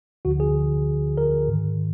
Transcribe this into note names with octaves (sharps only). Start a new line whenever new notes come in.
D2 D3 F3 F#4
G#4
A#4
G#2 D#3